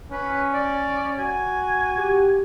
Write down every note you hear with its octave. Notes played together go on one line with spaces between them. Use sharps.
C#4 B4
D5
F#4 G#5
G4